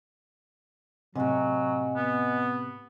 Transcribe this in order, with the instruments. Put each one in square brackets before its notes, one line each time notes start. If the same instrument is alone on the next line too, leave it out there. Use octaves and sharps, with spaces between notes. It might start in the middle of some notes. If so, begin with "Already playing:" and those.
[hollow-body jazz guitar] A2 C3 [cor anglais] F#3 [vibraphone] D#5 F#5 G#5
[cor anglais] B3